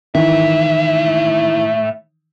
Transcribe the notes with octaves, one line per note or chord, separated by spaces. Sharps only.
A2 D#3 E3 E5